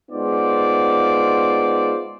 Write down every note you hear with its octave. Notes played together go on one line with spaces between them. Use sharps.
G#3 B3 D#4 F4 C5 D5